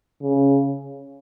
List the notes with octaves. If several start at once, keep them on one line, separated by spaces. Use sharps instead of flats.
C#3